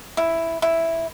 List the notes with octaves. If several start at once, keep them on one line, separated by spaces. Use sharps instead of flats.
E4
E4